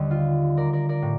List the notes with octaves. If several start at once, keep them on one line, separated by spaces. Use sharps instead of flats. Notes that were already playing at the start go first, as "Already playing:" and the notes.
Already playing: D#2 D3 G3
F4
A#4 D5
A#4 D5
A#4 D5
A2